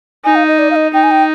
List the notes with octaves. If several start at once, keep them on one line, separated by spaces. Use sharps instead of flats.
D#4 G#5
F5
D#5
D5
F5
D#5
D#4 G5
G#5
G5